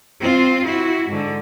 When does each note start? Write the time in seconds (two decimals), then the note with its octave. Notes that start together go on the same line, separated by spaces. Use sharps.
0.21 C4 F4
0.66 E4 F#4
1.09 G#2 D3